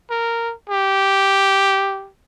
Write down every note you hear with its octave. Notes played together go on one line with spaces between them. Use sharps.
A#4
G4